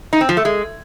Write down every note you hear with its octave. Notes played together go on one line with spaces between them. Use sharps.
D#4
C4
F3
A3
G#3